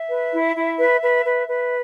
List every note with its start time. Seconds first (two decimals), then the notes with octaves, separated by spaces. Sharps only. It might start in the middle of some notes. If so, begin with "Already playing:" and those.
Already playing: E5
0.09 B4
0.32 E4
0.56 E4
0.79 B4
1.02 B4
1.25 B4
1.48 B4